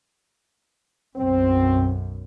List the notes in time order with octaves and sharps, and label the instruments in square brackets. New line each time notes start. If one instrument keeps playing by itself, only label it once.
[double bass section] B1 F#2 [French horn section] C4